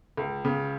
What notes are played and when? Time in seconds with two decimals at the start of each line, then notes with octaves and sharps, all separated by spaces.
0.17 C#2
0.45 C#3